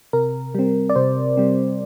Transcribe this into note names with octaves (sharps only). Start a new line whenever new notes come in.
C3 A#4
G3 C4
D5
C3 C5
G3 C4